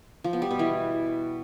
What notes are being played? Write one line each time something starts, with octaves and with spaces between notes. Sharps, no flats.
F3
B3
G3
B2
E3